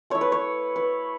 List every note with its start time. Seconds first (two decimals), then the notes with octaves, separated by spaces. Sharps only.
0.10 A3 E4 C#5
0.21 B4
0.32 C#5
0.76 B4